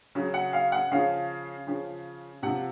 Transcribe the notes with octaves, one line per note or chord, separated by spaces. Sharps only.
C#3 F#3
F#5
F5
F#5
C#3 F3 F5
C#3 F3
C3 F3 F#5